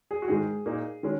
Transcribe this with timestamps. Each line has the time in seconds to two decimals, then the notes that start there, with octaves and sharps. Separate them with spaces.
0.11 G#4
0.22 F#4
0.28 G#2 D#3 G#3 G#4
0.66 A#2 A#3 D#4
1.03 D#3 G#3 C#4